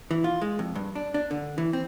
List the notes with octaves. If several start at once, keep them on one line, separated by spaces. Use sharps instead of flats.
E3
F4
G#3
F2
G2
D4
D4
D3
E3
C4